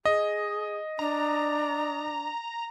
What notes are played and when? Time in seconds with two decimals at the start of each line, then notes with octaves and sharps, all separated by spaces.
0.05 G#4 D#5
0.99 D4 A#5